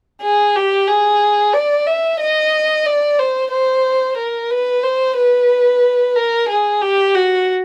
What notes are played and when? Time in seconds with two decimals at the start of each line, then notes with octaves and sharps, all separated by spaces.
0.22 G#4
0.55 G4
0.88 G#4
1.54 D5
1.86 E5
2.19 D#5
2.85 D5
3.19 C5
3.51 C5
4.17 A#4
4.51 B4
4.83 C5
5.16 B4
6.16 A#4
6.48 G#4
6.81 G4
7.14 F#4